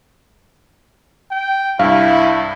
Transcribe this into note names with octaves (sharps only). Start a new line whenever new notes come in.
G5
C2 G2 E4 F5